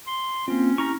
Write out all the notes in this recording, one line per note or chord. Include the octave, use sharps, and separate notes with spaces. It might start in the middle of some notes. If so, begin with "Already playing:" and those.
C6
A#3 C4 C#4 F4
E4 G4 A#5 C#6 F6 A#6